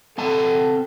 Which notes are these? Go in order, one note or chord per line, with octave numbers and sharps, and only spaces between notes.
C4 A4 F#5 A5